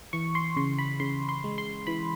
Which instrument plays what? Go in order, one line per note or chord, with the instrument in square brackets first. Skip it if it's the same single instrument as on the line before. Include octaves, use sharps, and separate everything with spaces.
[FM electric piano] E3 C#6
C6
C#3 C6
B5
C#3 C6
C6
G#3
C6
E3 B5